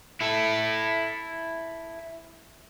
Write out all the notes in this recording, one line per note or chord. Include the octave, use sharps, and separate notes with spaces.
E4 A4